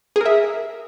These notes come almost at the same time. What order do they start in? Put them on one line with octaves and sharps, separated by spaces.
G#4 A#4 E5